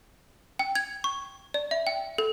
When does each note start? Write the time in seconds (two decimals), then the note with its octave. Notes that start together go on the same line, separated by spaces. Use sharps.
0.59 G5
0.75 G#6
1.04 C#6
1.54 D5
1.71 E5
1.87 G5
2.18 A4